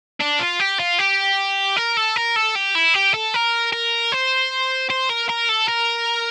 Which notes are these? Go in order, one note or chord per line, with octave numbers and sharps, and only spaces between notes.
D4
F4
G4
F4
G4
A#4
A4
A#4
A4
G4
E4
G4
A4
A#4
A#4
C5
C5
A#4
A#4
A4
A#4